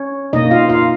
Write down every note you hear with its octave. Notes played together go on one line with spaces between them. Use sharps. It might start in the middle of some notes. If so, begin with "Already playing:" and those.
Already playing: C#4 C#5
B2 A#3 D#4 D#5
F4 F5
F4 F5